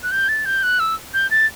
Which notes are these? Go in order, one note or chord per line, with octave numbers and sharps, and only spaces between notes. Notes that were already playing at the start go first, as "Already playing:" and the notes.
F#6
G6
A6
G6
F#6
E6
G6
A6